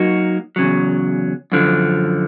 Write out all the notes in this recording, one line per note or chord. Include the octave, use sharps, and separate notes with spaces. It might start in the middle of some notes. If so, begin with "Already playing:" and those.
Already playing: F#3 A#3 D#4 F#4 A#4
E2 C#3 F#3
F#2 D3 F3